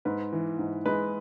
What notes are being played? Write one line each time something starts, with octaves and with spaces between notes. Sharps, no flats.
G#2 B4
E3
G#2
G#3 B4